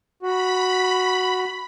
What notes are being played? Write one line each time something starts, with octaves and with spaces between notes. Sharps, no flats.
F#4 B5